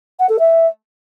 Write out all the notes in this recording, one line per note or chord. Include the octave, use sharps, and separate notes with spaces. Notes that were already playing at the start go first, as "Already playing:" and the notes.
F#5
A4
E5